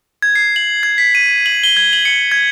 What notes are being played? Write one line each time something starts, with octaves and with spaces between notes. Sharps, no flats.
G#6
C7
F#7
G#6
B6
D#7
F#7
G7
G#6
F#7
C#7
G#6